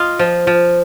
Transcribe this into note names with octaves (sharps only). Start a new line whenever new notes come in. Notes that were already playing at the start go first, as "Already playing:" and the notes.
Already playing: F4 D#5 F5
F3
F3